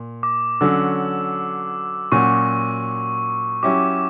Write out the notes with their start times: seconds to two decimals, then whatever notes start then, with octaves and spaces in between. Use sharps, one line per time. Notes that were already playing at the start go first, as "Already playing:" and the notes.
Already playing: A#2
0.23 D6
0.61 D3 F#3 C#4 E6
2.12 A#2 F#3 C#4 F#4 C#6
3.63 F#3 C#4 E4 G4 D6